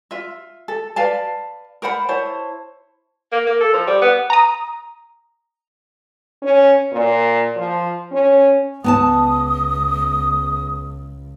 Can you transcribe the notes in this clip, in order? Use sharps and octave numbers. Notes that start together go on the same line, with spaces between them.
F4 E5
A4
B4 D5 F5 A5
A#4 C5 F#5 B5
E4 C5 C#5 A5
A#3
A#3
A4
F3
G3
B3
A#5 D#6
C#4
A#2
F3
C#4
C#2 B3 G#5 A5 D#6